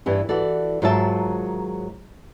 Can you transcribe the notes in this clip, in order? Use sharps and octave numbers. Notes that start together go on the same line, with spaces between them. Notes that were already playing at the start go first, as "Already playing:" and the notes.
G2 E3 G3
E3 F#4 A4 D5
G#2 D#3 F#3 F4 E5 A5